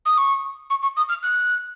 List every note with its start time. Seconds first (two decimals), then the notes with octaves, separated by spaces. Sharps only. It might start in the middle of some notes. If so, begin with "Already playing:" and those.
0.05 D#6
0.17 C#6
0.70 C#6
0.82 C#6
0.96 D#6
1.09 F6
1.23 F#6